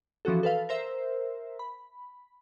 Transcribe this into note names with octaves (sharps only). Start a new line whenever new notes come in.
E3 F3 C#4 F#4 A4
A4 B4 F5
A#4 C5 E5
B5